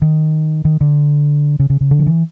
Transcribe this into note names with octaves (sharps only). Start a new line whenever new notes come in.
D#3
D#3
D3
C#3
C#3
C#3
D3
F3
E3